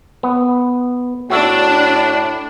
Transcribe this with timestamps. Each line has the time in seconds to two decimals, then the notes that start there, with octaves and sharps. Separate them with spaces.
0.23 B3
1.30 A2 D4 F#4 E5